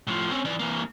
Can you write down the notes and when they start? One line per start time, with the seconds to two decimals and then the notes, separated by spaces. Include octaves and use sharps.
0.07 A2 F3
0.31 C4 C#4
0.45 E3 D5
0.59 E3 A#3